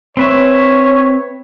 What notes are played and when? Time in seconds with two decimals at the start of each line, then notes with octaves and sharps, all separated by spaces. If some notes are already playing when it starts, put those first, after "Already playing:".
0.17 C4 B4 C#5 E5